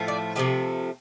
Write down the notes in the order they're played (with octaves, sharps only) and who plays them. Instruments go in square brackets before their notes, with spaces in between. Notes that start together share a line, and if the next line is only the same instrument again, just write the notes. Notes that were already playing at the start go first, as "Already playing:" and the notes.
Already playing: [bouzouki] A2 F3 A3
D5
C3 F3 A3 G4